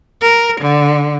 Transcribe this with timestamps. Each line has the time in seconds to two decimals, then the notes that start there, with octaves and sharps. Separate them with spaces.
0.22 A#4
0.61 D3